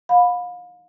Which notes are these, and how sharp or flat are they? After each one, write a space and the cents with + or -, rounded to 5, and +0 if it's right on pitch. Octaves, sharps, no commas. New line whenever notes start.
F5 +35 B5 +5